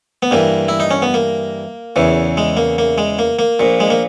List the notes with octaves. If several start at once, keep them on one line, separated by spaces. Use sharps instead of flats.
B3
G2 E3 A#3
E4
D#4
C#4
B3
A#3
E2 C#3 E3
G#3
A#3
A#3
G#3
A#3
A#3
A#1 A#2
G#3
A#3